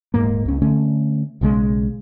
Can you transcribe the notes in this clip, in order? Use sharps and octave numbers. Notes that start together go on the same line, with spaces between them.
D#1 D#2 G#2 A#3
C#2 C#4
D3 A3 C#4
B1 C#3 E3 G#3